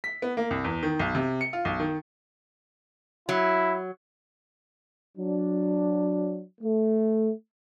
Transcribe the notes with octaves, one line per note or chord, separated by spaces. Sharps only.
B6
B3
A#3
C2
E2
D#3
B1
C3
C#7
F4
B1
D#3
F#3 E4
F#3 D4
A3